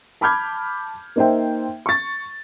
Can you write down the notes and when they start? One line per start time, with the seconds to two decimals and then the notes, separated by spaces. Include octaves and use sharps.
0.21 A5 B5 D6 F6 G6 G#6
1.16 A#3 D#4 C5 E5 G5
1.86 C#6 A6